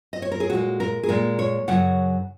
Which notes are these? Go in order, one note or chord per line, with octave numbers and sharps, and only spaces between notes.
D#5
C#5
A#4
G#4
A#2 G#3 F#4
A#4
G#4
A#2 G#3 A#4
C#5
F#2 C#3 F#3 F#5